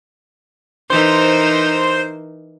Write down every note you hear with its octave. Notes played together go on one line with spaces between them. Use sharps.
E3 D#4 A#4 C5